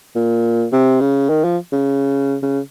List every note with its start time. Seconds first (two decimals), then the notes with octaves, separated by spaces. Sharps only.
0.15 A#2
0.72 C3
1.01 C#3
1.29 D#3
1.44 F3
1.72 C#3
2.43 C#3